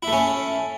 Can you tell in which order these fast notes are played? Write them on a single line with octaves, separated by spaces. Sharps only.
E4 A3 C#4